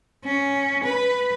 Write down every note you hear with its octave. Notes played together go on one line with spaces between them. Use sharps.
C#4
B4